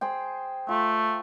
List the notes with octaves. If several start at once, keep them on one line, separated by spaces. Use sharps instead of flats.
G#4 C5 G5
A3 F4